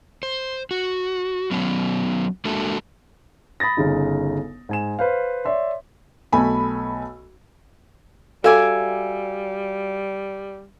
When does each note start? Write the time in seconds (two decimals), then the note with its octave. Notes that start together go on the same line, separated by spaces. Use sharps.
0.23 C5
0.71 F#4
1.51 F#3 B3 C#4
2.45 G#3 A#3 D4 F#4 A4 E5
3.60 B5 D#6 A6 A#6
3.77 G1 C#3 D#4
4.69 G#2 G#5 E7
4.99 B4 C5 F5
5.45 C#5 D5 E5 C6
6.33 B1 A3 G#5 B5
8.44 G3 F#4 A4 E5 F5 G#5 D6